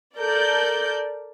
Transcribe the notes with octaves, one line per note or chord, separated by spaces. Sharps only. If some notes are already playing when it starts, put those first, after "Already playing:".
A4 A#4 D5 G6